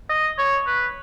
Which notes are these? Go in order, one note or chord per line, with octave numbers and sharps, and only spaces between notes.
D#5
C#5
B4